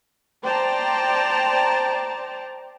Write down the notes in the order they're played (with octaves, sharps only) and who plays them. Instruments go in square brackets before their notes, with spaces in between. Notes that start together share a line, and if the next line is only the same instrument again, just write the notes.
[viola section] C5 D5 G5 A5 A#5